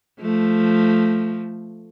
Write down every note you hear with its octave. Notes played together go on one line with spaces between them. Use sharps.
F3 A3